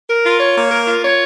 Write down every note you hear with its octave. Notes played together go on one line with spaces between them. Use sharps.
A#4
F4
C#5
A#3
A#4
F4
C#5